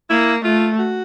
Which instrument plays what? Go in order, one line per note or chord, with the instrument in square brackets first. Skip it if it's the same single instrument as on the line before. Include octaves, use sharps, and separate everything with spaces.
[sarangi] A#3 [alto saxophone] E4
[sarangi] A3 [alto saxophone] F4
[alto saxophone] F#4